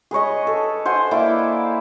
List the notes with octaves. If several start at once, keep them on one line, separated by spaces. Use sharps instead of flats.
G#4 B4 C#5 D#5
A4
C5 F#5 G#5
A#3 E4 D5 D6